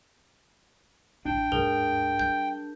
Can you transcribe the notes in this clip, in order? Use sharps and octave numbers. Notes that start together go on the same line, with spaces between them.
A1 D4 E4 G5
D#2 G#2 G#4 A#4
G3 G6